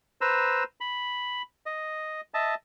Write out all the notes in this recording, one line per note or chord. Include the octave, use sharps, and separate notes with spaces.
B4 C5 A#5 E6
B5
D#5
D#5 E5 A5